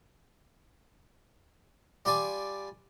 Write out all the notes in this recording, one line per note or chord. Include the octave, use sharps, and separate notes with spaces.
G3 F4 D5 G#5